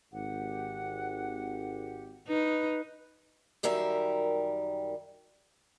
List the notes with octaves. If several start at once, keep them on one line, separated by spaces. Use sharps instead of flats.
G#1 G4 F#5
D#4 B4
F#2 D#3 G3 A#4 E5